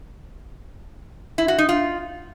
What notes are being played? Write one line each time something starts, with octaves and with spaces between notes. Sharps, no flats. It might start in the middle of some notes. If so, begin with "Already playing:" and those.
E4
F#4
D#4
F4